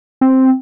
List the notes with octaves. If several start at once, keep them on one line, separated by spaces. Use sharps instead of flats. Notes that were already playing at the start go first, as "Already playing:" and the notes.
C4